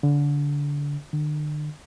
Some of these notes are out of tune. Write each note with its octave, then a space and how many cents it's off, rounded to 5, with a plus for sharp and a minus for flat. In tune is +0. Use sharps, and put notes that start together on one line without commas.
D3 -25
D3 +40